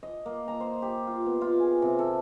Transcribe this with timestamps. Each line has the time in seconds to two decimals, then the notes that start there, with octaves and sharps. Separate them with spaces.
0.03 D#5
0.26 A#3
0.48 A#5
0.60 C5
0.82 G4
1.07 F4
1.26 B3
1.41 F4
1.60 G#4
1.82 C3
1.99 A4